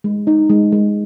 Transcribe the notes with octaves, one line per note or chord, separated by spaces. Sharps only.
G#3
D#4
G#3
G#3